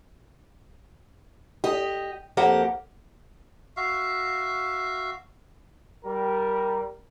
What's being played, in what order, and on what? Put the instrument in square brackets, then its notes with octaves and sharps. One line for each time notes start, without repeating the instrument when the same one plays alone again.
[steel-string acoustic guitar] G4 D#5
F2 A#3 G4 F#5
[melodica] F#4 E5 F5
[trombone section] G3 A#4